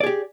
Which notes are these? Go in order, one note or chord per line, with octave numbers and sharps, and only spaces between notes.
G4 G#4 D5